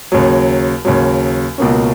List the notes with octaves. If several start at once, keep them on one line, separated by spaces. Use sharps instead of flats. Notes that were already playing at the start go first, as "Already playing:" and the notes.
D#2 C#3 F#3
D#2 C#3 F#3
C#2 B2 A#3 C#4